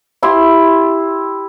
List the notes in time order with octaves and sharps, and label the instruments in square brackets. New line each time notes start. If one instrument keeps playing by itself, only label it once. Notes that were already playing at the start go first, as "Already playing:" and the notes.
[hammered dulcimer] E4 G4 C6